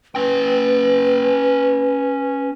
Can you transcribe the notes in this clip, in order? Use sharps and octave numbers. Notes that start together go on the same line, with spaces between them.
C#4 B4 G5